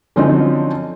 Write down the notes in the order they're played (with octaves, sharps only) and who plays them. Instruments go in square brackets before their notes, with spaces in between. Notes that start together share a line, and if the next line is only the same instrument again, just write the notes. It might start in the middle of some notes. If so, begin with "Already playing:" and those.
[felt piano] D3 F3 F#3 C4 C#4 D#4